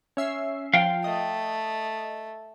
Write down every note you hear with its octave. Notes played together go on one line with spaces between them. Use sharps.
C#4 E5 C7
F3 F5 G5
A3 D#5